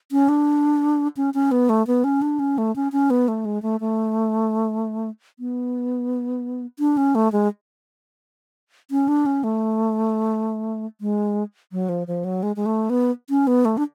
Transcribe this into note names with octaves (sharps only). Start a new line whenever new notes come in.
C#4
D4
C#4
C#4
B3
A3
B3
C#4
D4
C#4
A3
C#4
C#4
B3
A3
G#3
A3
A3
B3
D4
C#4
A3
G#3
C#4
D4
C#4
A3
G#3
F#3
F3
F3
F#3
G#3
G#3
A3
B3
C#4
B3
A3
D4